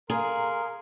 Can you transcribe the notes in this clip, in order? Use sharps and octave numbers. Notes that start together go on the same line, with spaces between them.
G#4 A#4 F5 A#5 C6